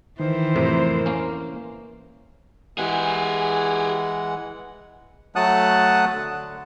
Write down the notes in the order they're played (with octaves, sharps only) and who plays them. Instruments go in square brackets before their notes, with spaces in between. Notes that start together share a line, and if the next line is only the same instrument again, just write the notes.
[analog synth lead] D#3 [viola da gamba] E3 [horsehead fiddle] C5
[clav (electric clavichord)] F2 A2 C3 [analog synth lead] A#4
[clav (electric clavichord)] A#3 C#4
[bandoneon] E3 G#3 F#5 [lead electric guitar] G4 G#4
[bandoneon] F#3 A3 F#5 A5 D#6 F#6
D3